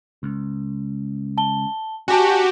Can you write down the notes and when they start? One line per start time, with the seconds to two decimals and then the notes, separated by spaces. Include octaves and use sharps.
0.23 C#2
1.38 A5 G7
2.08 D4 F#4 G4 G#5 A5